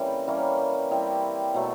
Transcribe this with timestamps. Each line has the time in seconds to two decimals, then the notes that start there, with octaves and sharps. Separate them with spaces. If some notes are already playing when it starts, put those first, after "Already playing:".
Already playing: C#3 E3 G3 A#3 C4
0.27 E3 G3 A#3 C#4
0.91 G3 C4 E4 G4
1.54 B2 F#3 A3